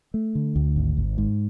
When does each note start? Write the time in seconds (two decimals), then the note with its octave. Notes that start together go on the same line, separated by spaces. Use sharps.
0.14 A3
0.35 D3
0.56 D2
0.76 G#1
0.97 G#1
1.18 G#2